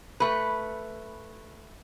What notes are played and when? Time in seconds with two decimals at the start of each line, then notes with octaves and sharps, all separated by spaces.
0.20 A3 B4